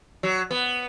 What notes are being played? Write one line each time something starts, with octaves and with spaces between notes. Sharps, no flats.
F#3
B3